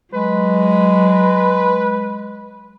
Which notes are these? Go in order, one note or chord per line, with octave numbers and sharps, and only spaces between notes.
F#3 G#3 B4